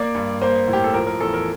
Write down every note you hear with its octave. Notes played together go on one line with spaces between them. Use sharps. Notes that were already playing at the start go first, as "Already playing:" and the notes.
Already playing: A#3 D5
G2
A#3 C5
A2
G4
A4
F3 A#4
A#4
E2 A4
A#4